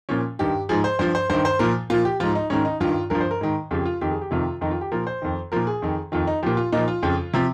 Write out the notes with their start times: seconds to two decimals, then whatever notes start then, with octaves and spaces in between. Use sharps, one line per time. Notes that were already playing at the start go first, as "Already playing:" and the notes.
0.09 A#2 F3 C#4
0.39 G2 D#3 G4
0.69 G#2 F3 G#4
0.84 C5
0.99 G2 F3 C5
1.15 C5
1.30 G2 D#3 C5
1.45 C5
1.59 A#2 F3 A#4
1.90 A#2 F3 F4
2.05 G4
2.20 G#2 F3 F4
2.35 D#4
2.50 G#2 D#3 C#4
2.65 D#4
2.80 G2 D#3 F4
3.10 G2 F3 A#4
3.20 C5
3.31 A#4
3.41 G#2 D#3
3.71 F2 C#3 F3 G4
3.85 F4
4.01 F2 D#3 G4
4.11 G#4
4.21 G4
4.31 F2 C3 D#3 F4
4.61 F2 D#3 D#4
4.71 F4
4.81 G4
4.92 A#2 F3 A#4
5.07 C5
5.22 F2 D#3
5.52 A#2 F3 A#4
5.67 G#4
5.82 F2 D#3
6.12 F2 D#3 F4
6.27 D#4
6.43 A#2 F3 G4
6.57 F4
6.72 A#2 F3 D#4
6.88 F4
7.03 F2 C#3 F3
7.34 C3 F3